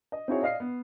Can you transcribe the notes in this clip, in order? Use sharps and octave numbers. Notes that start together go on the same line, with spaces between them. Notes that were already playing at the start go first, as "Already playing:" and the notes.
D#5
C4 D#4 E4 F#4 G#4 C#5
D5 D#5 F5 F6 C7
B3